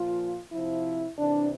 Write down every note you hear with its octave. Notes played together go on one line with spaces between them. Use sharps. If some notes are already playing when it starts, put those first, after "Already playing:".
Already playing: A#2 F3 F4
C3 F3 E4
C3 E3 D4